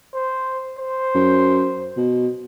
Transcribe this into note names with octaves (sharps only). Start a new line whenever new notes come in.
C5
C5
F#2
B2